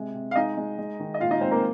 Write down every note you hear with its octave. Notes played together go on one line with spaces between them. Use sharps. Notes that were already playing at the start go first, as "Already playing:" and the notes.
Already playing: C3 G#3
C3
F5
G#3 D#4 D#5
G#3
G#3
D#3
D#5
A#2 F4 F5
D#4 D#5
G#3 C4 C5
A#3 A#4